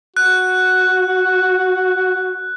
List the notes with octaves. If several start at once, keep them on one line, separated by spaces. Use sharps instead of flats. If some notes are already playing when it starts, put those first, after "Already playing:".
F#4 F#6